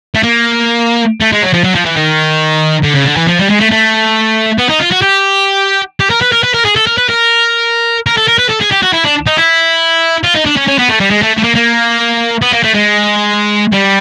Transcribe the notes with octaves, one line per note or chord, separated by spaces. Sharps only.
A3
A#3
A3
G#3
F#3
F3
F#3
F3
E3
D#3
D3
C#3
D3
E3
F3
G3
G#3
A3
A3
B3
D#4
F4
F#4
G4
G4
A#4
B4
A#4
B4
A#4
G#4
A4
A#4
B4
A#4
A#4
A4
A#4
B4
A4
G#4
G4
F#4
E4
D4
D#4
E4
F4
D#4
D4
C#4
C#4
B3
A3
G3
G#3
A3
A3
A#3
A#3
B3
A#3
A3
G#3
G3